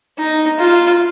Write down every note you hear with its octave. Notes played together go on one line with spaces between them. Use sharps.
D#4
F4